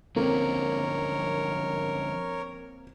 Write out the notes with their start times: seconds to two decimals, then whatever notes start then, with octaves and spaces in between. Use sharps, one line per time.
0.16 D3 F3 A#3 C4 C#4 A#4 C#5